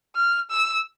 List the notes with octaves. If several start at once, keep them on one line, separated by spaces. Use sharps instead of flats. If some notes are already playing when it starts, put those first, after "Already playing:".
F6
E6